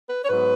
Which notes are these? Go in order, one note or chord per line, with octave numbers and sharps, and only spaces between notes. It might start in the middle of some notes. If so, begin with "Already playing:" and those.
B4
C#5
G#2 F#3 B3 B4